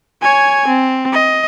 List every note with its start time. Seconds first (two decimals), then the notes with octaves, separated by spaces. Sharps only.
0.21 C#5 G#5
0.67 C4
1.13 D#5